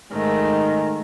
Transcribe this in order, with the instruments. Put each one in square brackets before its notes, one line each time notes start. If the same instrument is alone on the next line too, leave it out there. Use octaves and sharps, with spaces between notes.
[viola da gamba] G#2 G#3 A3 [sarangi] D#3